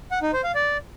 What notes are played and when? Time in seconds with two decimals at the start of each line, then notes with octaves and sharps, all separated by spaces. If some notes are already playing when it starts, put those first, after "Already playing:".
0.11 F#5
0.22 D#4
0.33 C5
0.44 F5
0.55 D5